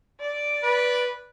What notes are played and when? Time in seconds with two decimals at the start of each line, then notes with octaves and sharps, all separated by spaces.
0.20 D5
0.63 B4